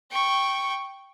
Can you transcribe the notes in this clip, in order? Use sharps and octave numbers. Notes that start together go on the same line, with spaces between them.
G5 C#6